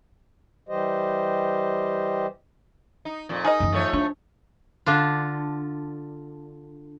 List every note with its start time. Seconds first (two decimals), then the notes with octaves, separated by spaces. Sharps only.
0.69 E3 G3 G4 C5 D#5
3.05 D#4
3.29 F2 A#2
3.45 D#4 G#4 A#4 D#5
3.60 F#2 E3
3.73 F3 A3 C#5
3.93 D4
4.86 D3 D4 F4